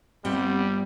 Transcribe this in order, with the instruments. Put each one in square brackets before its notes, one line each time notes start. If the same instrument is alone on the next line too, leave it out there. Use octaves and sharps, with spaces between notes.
[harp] G1 G2 B3 [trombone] G3 [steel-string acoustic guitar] C4 G4 F#5